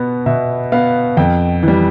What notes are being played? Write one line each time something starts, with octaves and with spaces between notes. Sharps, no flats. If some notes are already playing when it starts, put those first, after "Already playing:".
Already playing: B2 B3
B2 E5
B3 F5
F2 G5
E3 G3